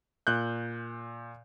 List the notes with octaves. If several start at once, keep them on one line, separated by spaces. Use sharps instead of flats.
A#2 F#6 G6